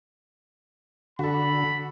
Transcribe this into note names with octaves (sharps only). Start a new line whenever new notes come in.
D3 F#4 A4 B5